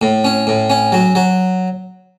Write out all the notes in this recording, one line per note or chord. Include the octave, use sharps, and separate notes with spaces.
A2
C#4
A2
C#4
F#3
F#3